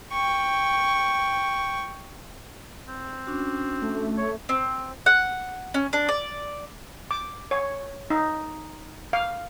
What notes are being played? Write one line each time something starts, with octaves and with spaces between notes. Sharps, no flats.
G5 C#6
C4
C#4 D4 F#4
A3
C#5
C4
F#5
C#4
D4
D5
D6
C#5
D#4
F5